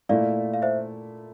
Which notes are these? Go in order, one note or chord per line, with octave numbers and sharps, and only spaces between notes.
A#2 A3 E4 A4 D5 F5
F5
C5 E5